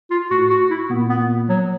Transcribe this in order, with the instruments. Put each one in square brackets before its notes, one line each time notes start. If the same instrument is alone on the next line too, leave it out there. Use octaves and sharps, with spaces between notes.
[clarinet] F4
[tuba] A2 [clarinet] F#4
[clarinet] F#4
E4
[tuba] A#2 [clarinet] B3
[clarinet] B3
F#3